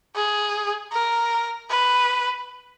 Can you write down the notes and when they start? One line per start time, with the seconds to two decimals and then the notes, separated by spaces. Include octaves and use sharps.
0.15 G#4
0.92 A#4
1.70 B4